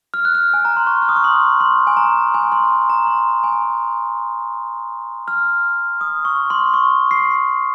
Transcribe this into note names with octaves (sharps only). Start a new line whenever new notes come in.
F6
F#6
F6
G#5
A#5
C6
C#6
F6
D#6
C#6
C6
C6
G#5
A#5
G#5
C6
A#5
C6
G#5
F6
D#6
C#6
C6
C#6
C7